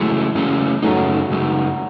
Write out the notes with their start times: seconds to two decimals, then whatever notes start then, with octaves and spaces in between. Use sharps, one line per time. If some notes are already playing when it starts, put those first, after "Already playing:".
Already playing: C#3 E3 F#3 G#3 A3 C#4
0.35 C#3 F#3 A3 C#4
0.82 F#2 C#3 F#3 G#3 A3 D#4
1.30 F#2 C#3 G#3 D#4